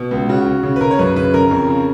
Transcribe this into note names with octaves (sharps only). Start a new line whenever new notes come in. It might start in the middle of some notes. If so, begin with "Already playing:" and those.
Already playing: B2
C#2
C#3 F#4
C#3
C#3
B4
C#3 A#4
C#5
F#2 B4
C#3 B4
C#3 A#4
F2
C#3